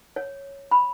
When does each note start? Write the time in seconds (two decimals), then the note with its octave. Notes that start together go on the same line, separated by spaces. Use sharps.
0.16 C#5
0.71 B5